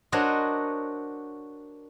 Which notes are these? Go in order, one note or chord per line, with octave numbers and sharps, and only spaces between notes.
D4 F#4 A#4 C5 C#5 D#5